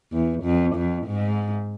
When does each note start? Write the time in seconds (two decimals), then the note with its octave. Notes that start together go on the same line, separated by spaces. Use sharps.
0.12 E2
0.43 F2
0.75 F2
1.07 G#2